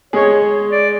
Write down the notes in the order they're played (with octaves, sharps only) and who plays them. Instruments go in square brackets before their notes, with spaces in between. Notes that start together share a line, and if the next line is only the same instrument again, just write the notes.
[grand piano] G#3 G#4 [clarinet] C#5
[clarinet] D5